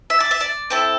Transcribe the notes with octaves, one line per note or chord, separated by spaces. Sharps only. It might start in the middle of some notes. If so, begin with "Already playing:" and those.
E5
D5
E5
D5
C4 E4 A4